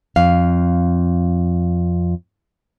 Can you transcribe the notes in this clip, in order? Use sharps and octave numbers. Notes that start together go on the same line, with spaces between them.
F2 F5